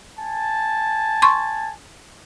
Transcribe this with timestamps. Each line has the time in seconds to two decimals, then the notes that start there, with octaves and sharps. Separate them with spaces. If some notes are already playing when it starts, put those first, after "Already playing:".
0.20 G#5 A5
1.22 C6 C#6